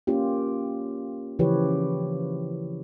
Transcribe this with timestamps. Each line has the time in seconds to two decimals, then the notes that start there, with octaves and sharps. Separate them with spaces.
0.07 A#3 C#4 F4 G4
1.39 C#3 E3 F3 G4 B4 C#5